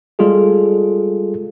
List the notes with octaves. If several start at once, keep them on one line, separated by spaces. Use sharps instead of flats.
G3 G#3 F4 G#4 A4